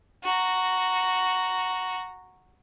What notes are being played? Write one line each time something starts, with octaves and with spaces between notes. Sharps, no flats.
F#4 A#5